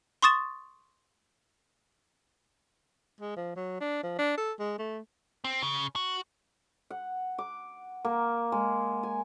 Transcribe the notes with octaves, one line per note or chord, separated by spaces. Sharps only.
C6 C#6 D#6 A6 E7
G#3
F3
F#3
D4
F3
D4
A4
G#3
A3
C4
C#3
F#4
F#5
D6
A#3
G#3
G#5